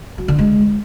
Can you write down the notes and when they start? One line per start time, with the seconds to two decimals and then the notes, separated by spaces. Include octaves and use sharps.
0.18 F#3
0.28 D3
0.39 G#3